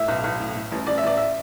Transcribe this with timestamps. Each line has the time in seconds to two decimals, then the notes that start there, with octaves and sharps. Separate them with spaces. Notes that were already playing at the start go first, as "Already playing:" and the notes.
Already playing: A2 E5
0.08 B1
0.24 B1
0.40 A2
0.55 A2
0.71 A1
0.87 A1 D5
0.98 E5
1.03 A1 D5
1.17 E5